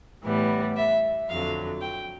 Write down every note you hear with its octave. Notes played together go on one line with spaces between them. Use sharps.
A2 E3 G3 B3
E5
F2 D3 F#3 F5
G5